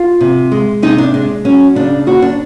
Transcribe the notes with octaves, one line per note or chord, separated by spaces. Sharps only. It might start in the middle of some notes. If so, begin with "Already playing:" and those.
Already playing: F4
C3
G#3
C3 D#4
D4
G#3 D4
F#3 C#4
C#3 D4
D#2 F#4
D4